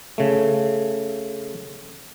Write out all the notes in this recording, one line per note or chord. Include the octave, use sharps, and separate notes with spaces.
C#3 A3